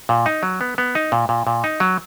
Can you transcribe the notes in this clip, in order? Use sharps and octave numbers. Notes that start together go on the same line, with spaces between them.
A#2
D#4
F#3
B3
B3
D#4
A#2
A#2
A#2
D#4
F#3